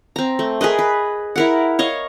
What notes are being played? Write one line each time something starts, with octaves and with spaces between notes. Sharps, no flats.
C4 A#5
A3
G#4 A#4 B4 D#5
B4
E4 A#4 F#5
C#5 D#5 F5